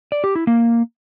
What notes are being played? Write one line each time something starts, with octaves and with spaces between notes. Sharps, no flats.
D5
G4
E4
A#3